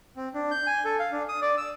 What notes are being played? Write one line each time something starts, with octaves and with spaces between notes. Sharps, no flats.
C4
D4
G6
G#5
A4
F5
D4
D#6
D5
E6